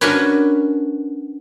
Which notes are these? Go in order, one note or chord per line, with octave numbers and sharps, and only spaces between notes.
C#4 D4 F#4 A#4 B4 C#5